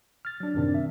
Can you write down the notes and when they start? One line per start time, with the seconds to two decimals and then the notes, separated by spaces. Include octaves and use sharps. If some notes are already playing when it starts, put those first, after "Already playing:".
0.25 F6 A6
0.40 F#3 D4
0.55 F#2 A2 C3 D#3 C4 D4
0.74 E5